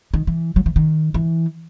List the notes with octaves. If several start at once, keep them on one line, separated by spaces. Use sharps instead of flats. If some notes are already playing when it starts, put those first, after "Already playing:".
D#3
E3
F#3
E3
D#3
E3